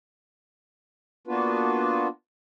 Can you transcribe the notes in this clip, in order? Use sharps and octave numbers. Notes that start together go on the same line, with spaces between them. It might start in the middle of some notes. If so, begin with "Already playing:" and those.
A#3 B3 D4 F4 F#4 B4